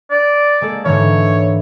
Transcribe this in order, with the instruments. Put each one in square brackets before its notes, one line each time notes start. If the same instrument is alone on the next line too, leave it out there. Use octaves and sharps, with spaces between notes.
[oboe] D5
[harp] G#3 A#3 A4
[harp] G#2 D3 E3 [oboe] C#5